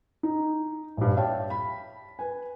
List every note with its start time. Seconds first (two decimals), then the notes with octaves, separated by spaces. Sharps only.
0.23 D#4
0.97 A#1 G2
1.16 C#5 E5 F5 G5 A5
1.50 B5
2.19 B4 G#5